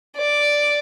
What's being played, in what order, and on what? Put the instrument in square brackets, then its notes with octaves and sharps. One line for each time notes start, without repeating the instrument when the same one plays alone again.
[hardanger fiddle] D5